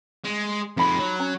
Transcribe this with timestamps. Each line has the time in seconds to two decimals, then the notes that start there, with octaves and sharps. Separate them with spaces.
0.25 G#3
0.77 F2 G#3 D#4 B5
0.98 F#3
1.19 C#4 A#5